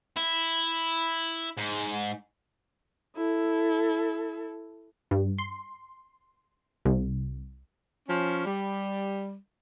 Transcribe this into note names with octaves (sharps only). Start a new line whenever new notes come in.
E4
G#2
E4 A4
G2
C6
C2
F3 C#4
G3